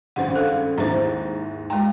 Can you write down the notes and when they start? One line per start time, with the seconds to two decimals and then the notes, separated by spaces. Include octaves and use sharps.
0.16 G#1 G2 C#3 C5 F#5
0.36 A4 F5
0.78 D#2 G#2 E4 C5 A#5
1.70 G#3 G5 A#5